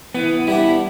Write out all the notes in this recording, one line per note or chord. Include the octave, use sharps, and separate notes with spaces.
E3 B3
G3 B3 D4 E4